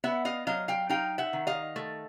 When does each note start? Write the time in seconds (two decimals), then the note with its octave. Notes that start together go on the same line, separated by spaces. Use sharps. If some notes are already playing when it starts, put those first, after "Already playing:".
0.04 B3 E5 F#5
0.25 D#5 F5
0.47 F#3 D#5 F5
0.68 F5 G5
0.89 D#4 F5 G5
1.18 E5 F#5
1.33 D#3
1.47 D#5 F5
1.76 A3